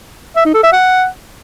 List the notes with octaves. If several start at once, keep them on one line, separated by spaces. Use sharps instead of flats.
E5
D#4
A4
E5
F#5